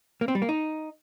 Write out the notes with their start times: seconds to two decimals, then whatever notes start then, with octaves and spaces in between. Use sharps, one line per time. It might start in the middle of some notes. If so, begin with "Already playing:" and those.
0.21 A#3
0.28 C4
0.35 G3
0.42 A#3
0.49 D#4